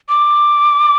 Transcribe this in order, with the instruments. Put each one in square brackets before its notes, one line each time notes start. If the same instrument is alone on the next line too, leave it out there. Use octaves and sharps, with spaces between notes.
[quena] D6